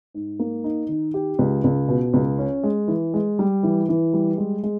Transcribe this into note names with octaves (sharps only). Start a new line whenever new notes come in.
G#2
A#3
D#4
D#3
G4
C#2
C#2
B2
C#2
C#4
G#3
E3
G#3
G3
E3
E3
G3
G#3
G#3